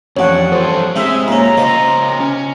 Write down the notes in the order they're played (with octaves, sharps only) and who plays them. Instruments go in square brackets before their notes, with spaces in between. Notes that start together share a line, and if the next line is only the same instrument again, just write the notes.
[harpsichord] A1 D4 [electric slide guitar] F2 [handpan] C#5 F#5
[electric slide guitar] G2 F3 A4 [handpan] C5
[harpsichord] C3 D#4 [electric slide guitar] G#3 [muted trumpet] E5
[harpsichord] A#2 C#4 [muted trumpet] A#5
[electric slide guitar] C#3 C5 [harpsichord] F4 [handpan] D#5
[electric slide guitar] C#4